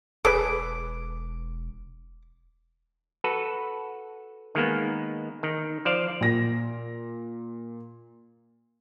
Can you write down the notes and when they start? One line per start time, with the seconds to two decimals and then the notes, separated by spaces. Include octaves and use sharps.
0.25 E1 G#4 A4 B4 D6
3.24 F#4 A4 B4
4.55 D#3 G#3 A#3 B3
5.43 D#3
5.85 F3 C5 D5 F5
6.21 A#2 A#6